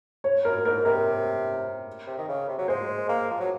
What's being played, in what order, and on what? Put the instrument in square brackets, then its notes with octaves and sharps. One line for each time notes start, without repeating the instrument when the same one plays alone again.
[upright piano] C#5
[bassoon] F#2 [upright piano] A#4
[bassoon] G#2 [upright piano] A#4
[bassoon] C3 [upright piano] A#4
[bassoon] C3
D#3
C#3
C3
F#3
[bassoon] G#3 [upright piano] C5
[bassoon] A#3
F3
F#3